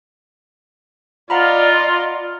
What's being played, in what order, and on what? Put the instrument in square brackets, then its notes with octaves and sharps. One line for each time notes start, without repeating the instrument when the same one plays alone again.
[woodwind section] F4 [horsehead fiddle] D5 D#5 [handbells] F#5 A#5 B5